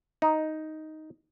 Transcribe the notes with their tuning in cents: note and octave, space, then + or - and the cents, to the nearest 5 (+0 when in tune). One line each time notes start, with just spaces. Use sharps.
D#4 +5